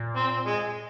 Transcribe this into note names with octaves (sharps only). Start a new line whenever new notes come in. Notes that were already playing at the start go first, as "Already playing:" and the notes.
Already playing: A#2
C4
G#3